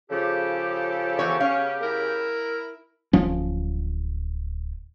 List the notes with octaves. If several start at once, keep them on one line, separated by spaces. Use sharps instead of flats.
C#3 F3 G4 A4
E3 B3 C#5
C#4 F5
E4 A#4
D1 F3 C#4